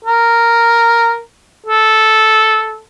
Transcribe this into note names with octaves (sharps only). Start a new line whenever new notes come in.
A#4
A4